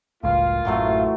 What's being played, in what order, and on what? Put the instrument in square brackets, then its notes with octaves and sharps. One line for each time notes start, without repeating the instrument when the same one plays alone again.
[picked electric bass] F#1 C#2 A2 [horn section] A#3 F4 [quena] F5
[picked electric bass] A1 F#2 [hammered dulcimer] E3 F#3 A3